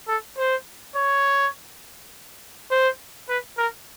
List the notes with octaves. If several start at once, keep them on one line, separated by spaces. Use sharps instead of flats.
A4
C5
C#5
C5
B4
A#4